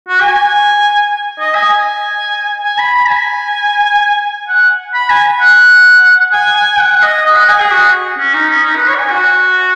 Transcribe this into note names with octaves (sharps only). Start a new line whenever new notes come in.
F#4
G#5
D#5
G#5
G#5
G#5
B5
B5
G#5
F#5
B5
G#5
F#5
G#5
G#5
F#5
D#5
D#5
F#5
G#5
G#4
F#4
C#4
D#4
C#4
D#4
B4
C#5
F#5
G#5
F#4